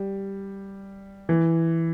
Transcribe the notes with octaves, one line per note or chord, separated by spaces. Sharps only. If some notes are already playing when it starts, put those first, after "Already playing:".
Already playing: G3
E3